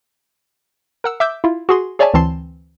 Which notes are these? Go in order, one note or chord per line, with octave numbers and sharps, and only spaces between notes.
A#4 F#5 E6
E5 D6 E6 G6
E4 F4
F#4 G#4 C6
G#4 C#5 D5 E5 G#5 A5
D2 E3 C4 A5 C6 C7